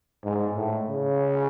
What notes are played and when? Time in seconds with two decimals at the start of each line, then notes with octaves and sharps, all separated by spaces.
0.24 G#2
0.56 A2
0.89 C#3